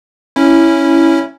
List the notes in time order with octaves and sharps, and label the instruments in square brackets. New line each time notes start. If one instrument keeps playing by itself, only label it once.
[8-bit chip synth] C#4 E4